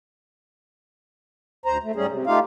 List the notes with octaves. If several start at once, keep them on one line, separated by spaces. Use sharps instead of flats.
D2 C5 A#5
A3
G#2 G3 C#4 G#4
C3
A3 D#4 F4 G4 F5